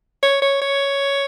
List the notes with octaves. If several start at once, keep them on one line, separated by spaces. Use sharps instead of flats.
C#5
C#5
C#5